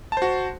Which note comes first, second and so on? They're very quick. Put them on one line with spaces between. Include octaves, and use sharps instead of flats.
A5 C5 F#4